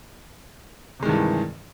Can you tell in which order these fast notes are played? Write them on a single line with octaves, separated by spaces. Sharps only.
C3 G#3 D#3 G2 E3